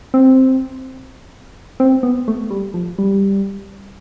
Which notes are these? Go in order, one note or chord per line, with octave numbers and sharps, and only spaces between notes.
C4
C4
B3
A3
G3
F3
G3